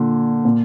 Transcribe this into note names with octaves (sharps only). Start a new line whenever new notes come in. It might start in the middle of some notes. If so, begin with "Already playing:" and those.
Already playing: A#2 D3
A#2